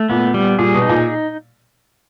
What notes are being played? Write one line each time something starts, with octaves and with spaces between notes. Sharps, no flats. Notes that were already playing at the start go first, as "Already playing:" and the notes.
Already playing: A3
A#2 B3
G3
A#2 G#4
B2
D#4
A#2